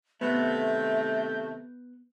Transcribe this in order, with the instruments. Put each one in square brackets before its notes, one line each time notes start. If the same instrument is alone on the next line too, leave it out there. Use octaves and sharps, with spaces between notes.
[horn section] C3 D#3 A3 [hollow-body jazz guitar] B3 [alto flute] E5 [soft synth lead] G6